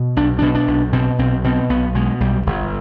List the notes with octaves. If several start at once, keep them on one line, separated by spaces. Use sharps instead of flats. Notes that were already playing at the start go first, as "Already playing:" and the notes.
Already playing: B2
B1 D4
B2 D4
D4
B1
B2 C4
B1 C4
B2 C4
B1 B3
B2 G#3
B1 G3
G1